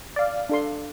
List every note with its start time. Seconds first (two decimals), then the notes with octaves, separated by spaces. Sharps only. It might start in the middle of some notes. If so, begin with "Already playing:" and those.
0.16 D5 F5
0.49 D4 A4 C6